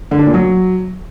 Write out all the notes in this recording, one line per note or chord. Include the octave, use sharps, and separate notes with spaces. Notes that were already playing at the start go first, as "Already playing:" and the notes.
D3
D4
A#2
F#3